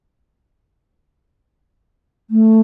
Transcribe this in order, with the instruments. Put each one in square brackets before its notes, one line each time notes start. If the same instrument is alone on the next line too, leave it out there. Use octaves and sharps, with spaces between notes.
[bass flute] A3